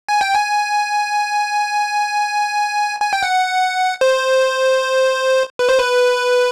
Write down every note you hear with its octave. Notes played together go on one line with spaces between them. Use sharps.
G#5
G5
G#5
G#5
G5
F#5
C5
B4
C5
B4